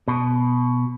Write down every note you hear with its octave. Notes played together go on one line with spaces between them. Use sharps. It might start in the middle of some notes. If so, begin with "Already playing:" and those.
B2